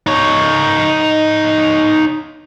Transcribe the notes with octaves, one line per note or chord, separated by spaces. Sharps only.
D#4 C#5